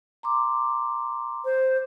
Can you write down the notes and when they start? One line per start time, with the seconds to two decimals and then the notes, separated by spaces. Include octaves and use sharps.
0.23 A#5 C6 D6
1.45 C5